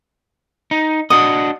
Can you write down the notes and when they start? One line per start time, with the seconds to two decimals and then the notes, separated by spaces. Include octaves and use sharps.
0.71 D#4
1.10 D4 F#4 D#5 D#6